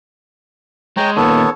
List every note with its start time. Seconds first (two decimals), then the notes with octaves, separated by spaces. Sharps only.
0.97 G#3 C#5 G5 A#5
1.17 A#2 D#3 B3 A4 C#5